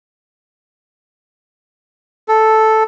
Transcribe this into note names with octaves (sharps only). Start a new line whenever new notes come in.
A4